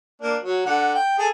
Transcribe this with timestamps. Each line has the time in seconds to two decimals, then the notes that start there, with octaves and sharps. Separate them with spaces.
0.21 A#3 D4
0.43 F#3
0.66 D3 F#5
0.95 G5
1.19 G#4 A4